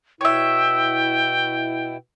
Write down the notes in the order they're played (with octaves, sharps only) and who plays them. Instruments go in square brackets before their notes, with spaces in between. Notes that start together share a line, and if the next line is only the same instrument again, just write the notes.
[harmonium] B2 E4 [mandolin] C#5 E5 [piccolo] G5